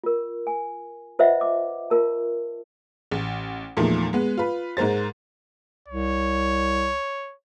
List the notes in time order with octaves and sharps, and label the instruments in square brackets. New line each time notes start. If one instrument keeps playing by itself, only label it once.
[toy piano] F4 A#4
G#5
F4 B4 C5 D#5 E5 F#5
D6
F4 A#4 A5
[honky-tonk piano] A1
E2 A#2 F3 A3 D#4
G#3 B3
F4 B4
G#2 G#3 A#4 C5 A6
[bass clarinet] C2 [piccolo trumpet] C#5